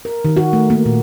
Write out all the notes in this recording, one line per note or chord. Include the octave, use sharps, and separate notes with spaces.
A#4
D#3
F#4
A3
A#3
A#2